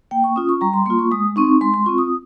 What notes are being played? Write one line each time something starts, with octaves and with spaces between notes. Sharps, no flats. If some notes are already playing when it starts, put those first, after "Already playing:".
A#3 G5
C#6
C#4 F4 D#6
C#6
G3 A#5
C6
A#3 F4 C6
C#6
G#3 D#6
C4 D#4 C#6
G#3 C6
C6
C4 F4 C#6
D#6